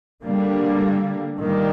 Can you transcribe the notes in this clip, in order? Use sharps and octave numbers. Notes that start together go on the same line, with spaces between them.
D3 G3 A#3
D#3 G3 A#3